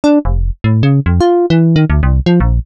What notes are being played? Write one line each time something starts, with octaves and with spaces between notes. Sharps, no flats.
D4
F1
A2
C#3
F2
F4
E3
D#3
D2
C2
F3
A#1